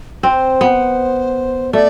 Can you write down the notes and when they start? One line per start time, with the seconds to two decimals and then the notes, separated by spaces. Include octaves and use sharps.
0.23 C4 C5
0.61 B3
1.73 A3 D5